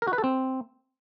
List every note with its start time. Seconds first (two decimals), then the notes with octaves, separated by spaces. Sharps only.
0.02 A#4
0.07 F#4
0.13 B4
0.18 A4
0.24 C4